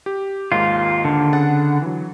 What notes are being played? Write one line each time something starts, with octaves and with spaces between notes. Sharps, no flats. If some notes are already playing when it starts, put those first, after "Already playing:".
G4
D#2 G#2 D#3 F4
D3
C#3 F#5 A6
E3 F#3